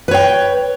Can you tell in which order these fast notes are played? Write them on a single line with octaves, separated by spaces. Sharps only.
B4 C#5 G5